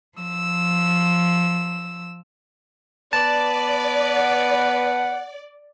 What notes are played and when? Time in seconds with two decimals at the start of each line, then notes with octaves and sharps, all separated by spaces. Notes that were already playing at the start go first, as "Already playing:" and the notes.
0.19 F3 E6
3.13 B3 B4 D5 A5
4.14 F#5